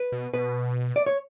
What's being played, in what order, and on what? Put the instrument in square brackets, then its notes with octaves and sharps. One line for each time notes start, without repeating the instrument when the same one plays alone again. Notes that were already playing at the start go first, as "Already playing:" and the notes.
Already playing: [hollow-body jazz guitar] B4
[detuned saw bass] B2
[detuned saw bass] B2 [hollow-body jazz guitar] B4
[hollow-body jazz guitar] D5
C#5